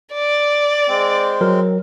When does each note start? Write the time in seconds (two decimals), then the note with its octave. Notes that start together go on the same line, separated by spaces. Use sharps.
0.14 D5
0.88 G#3 C4
1.41 F#3 A#4